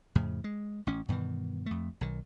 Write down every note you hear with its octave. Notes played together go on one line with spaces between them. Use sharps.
F2 A2 C#3
G#3
A1 C#4
G2 B2 D#3 E3
F2 A3
B1 D#3